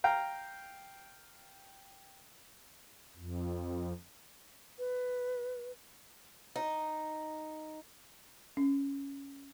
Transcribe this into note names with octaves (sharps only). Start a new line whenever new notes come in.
F5 G5 A#5
F2
B4
D#4
C#4